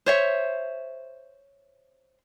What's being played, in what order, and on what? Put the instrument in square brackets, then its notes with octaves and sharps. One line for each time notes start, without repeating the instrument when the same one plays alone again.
[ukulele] C5 C#5 E5